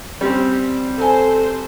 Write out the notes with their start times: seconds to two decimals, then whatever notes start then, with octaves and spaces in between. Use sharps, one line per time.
0.21 G3 C4 C#4
0.98 F#3 A4 C5 G#5